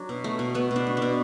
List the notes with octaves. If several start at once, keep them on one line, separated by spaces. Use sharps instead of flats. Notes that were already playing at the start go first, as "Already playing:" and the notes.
Already playing: F#3 D4
B2
A3
B2
A3 B3
B2
D4
A3
D4
B2